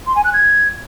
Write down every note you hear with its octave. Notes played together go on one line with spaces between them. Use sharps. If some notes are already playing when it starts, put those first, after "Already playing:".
C6
G#5
F#6
G#6